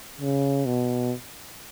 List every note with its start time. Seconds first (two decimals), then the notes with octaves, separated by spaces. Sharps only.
0.21 C#3
0.66 B2